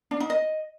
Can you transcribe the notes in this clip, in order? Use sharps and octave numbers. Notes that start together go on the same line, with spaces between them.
D4
D#4
D#5